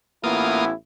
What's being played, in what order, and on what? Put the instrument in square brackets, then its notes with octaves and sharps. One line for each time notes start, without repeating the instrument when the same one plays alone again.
[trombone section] A1 B3 E4 [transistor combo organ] A#3 F4 D#6